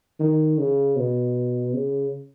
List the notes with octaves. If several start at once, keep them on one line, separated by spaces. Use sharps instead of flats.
D#3
C#3
B2
C#3